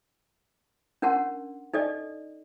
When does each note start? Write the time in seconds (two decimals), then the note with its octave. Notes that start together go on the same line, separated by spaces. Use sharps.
1.02 C#4 D4 A#4 F#5 A5 C6
1.74 D#4 A4 D5 D#5